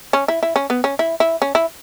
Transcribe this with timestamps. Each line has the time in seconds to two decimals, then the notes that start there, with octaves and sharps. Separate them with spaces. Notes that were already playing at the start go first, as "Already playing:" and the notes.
0.13 C#4
0.28 E4
0.43 E4
0.56 C#4
0.70 B3
0.84 C#4
0.99 E4
1.20 E4
1.42 C#4
1.55 E4